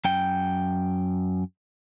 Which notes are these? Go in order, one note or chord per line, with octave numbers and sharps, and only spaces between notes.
F#2 G5